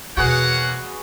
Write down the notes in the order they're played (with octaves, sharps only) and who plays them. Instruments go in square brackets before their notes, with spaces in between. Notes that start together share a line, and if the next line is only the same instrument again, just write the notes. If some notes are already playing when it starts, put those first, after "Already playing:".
[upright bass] E2 B2 [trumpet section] A#3 C#5 F#5 [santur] F#4 G#4 B4